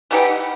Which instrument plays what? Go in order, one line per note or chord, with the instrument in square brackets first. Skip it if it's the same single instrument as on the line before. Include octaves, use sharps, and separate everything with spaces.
[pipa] E3 G3 D#4 G4 [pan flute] F#5